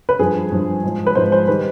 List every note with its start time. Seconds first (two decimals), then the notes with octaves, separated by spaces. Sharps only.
0.09 B4
0.19 G2 F3 G#4
0.51 G2 F3
0.83 G#2 F3
1.07 B4
1.15 G#2 F3 C5
1.32 C5
1.48 D#3 G3 B4